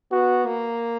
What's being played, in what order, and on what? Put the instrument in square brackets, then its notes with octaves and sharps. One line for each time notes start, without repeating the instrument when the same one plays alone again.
[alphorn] B3 [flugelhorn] F#4
[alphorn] A#3